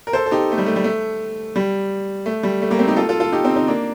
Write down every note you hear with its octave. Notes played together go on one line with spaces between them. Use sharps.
A#4
A4 C5
A4
D#4 G4
A3
G3
A3
G3
A3
G3
A3
G3
A3
G3 A#3
A3 C4
D#4 G4
F4 A4
F4 A4
F4 A4
D#4 G4
C4 D#4
C4 D#4
A#3 D4